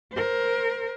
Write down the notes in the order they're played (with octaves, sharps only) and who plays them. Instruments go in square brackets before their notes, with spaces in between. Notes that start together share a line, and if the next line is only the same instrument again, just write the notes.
[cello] A#4 C5